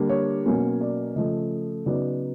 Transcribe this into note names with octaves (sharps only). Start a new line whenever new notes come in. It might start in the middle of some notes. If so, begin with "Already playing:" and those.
Already playing: D3 G3 A#3 D4
C#5
B2 F#3 A#3 C#4
D5
C#3 F3 A3 D#5
C#3 F#3 B3 D#4 D5